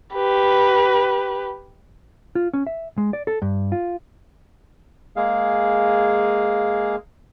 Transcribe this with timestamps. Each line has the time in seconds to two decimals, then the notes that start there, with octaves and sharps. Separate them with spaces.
0.14 G4 B4
2.35 F4
2.53 C#4
2.67 E5
2.98 G#3
3.13 D5
3.27 A4
3.42 G2
3.72 F4
5.16 G#3 A#3 G#4 F5